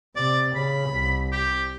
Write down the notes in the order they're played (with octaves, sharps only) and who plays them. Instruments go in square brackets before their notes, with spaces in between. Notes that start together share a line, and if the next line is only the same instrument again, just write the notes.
[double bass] C3 [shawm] D5
[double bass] C#3 [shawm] B5
[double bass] C2
[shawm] G4